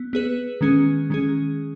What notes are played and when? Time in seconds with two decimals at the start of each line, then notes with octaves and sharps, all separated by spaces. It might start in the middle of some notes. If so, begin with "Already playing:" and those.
Already playing: B3
0.13 B3 G#4 B4
0.61 D#3 G#3 C#4 G#4
1.10 D#3 G#3 C#4 G#4